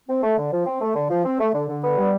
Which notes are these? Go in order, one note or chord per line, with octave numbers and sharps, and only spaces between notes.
C4
A3
D3
F3
C4
A3
D3
F3
C4
A3
D3
D3
B3
G3